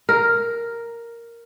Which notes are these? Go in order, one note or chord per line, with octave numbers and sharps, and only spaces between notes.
A#4